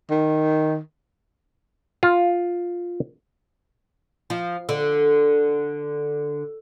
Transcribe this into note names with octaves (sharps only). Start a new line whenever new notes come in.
D#3
F4
F3
D3